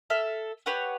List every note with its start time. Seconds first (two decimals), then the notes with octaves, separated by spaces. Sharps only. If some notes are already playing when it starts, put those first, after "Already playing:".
0.10 A4 E5 F6
0.66 G4 B4 C#5 F#5